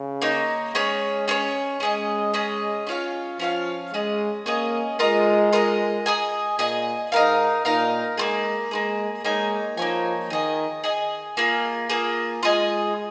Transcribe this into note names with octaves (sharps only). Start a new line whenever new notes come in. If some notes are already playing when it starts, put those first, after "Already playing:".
Already playing: C#3
A#3 D#4 C#5
G#3 C#4 G#4 C#5
C#4 G#4 C#5
G#3 C#4 G#4 D#5
C#4 G#4 D#5
C#4 F4 C#5 F5
F3 C#4 F4 C#5 F5
G#3 C#4 G#4 D#5
A#3 C#4 G#4 D#5
G#3 F4 A#4 D#5
F4 A#4 D#5
G#4 D#5 G#5
A#2 G#4 D#5 G#5
G#2 D#4 A#4 F5
A#2 D#4 A#4 F5
G#3 A#3 F4 G#4
G#3 A#3 F4 G#4
G#3 A#3 D#4 C#5 G#5
F3 A#3 D#4 C#5 G#5
D#3 G#4 D#5 G#5
G#4 D#5 G#5
A#3 F4 G#4
A#3 F4 G#4
G#3 F4 G#4 D#5 G#5